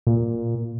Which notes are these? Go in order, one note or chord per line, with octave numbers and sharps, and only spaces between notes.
A#2